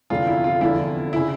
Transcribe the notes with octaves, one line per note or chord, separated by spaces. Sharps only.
F1 E2 D3 F3 F4
E4
F4
F1 E2 D3 F3 E4
C#3 E4